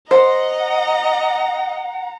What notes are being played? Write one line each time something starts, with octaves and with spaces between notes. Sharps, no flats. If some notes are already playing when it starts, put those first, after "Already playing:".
C5 D#5 F#5 A#5